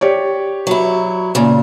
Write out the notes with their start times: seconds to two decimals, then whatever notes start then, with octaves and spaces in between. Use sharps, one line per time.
0.01 G4 C#5 D5
0.67 F#3 E4
1.35 A#2 C#3